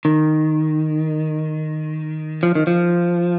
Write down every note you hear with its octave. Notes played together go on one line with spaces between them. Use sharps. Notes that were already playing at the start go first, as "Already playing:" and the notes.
D#3
F3
D#3
F3